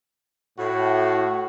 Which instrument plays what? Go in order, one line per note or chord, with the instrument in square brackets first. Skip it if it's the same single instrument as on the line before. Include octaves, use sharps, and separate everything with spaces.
[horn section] A2 [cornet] F#4